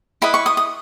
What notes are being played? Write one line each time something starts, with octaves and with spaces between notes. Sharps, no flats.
E4 B4 D#5 B5
C#6
D#6
D#6